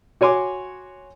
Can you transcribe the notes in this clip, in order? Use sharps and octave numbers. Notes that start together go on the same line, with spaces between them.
F#4 C#5 G#5 C6 D6